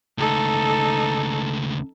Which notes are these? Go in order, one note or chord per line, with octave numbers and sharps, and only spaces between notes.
C#2 A3 D#4 A4